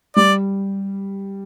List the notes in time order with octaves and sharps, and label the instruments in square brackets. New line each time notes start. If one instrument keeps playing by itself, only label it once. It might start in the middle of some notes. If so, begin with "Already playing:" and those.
[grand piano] G3 [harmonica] D5